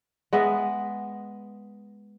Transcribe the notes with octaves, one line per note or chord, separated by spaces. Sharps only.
G#3 B3 D#5 E5